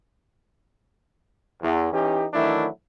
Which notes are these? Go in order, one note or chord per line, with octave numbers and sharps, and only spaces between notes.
E2
E3 C#4 D#4 G4
D#3 E3 F#3 A3 D4 E4